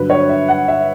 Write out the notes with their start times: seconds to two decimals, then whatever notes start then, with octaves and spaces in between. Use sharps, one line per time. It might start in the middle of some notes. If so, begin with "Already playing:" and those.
Already playing: G2 D3 F#3 B4
0.10 C#5
0.29 E5
0.48 F#5
0.68 E5